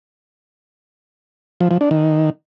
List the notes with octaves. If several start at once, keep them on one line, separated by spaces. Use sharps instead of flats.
F3
F3
D4
D#3